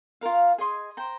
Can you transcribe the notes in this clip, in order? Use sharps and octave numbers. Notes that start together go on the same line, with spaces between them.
F4 A#4 F5
G#4 D#5 G#5 C6
C5 G5 A#5